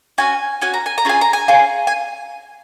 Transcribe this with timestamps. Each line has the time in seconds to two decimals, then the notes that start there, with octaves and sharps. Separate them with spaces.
0.18 C#4 F#4 G#5
0.61 C#4 F#4 G#5
0.74 A#5
0.86 G#5
0.98 A#5
1.05 C#4 F4 G#4 G#5
1.21 A#5
1.33 G#5
1.48 C#4 F4 G#4
1.87 G#5